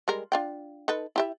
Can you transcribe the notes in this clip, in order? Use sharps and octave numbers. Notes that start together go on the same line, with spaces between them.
G3 G#3 A#4
D4 F4 G5
D#4 A4 B4
E4 G4 E5